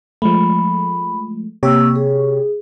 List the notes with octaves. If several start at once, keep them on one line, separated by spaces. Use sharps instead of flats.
F3 G#3 A3 B5
C3 A#3 G4 C#5 E6
G#4